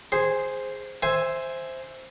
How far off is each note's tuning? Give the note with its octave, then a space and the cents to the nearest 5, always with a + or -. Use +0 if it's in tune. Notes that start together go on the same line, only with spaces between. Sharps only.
G#4 -5 C5 +0
C5 +0 E5 +0 G#5 +0